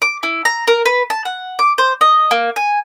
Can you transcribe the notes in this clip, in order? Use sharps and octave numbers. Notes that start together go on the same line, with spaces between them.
D6
E4
A#5
A#4
B4
A5
F#5
D6
C5
D#5
A#3
G#5